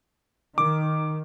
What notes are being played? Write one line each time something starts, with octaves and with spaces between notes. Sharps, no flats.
D#3 D6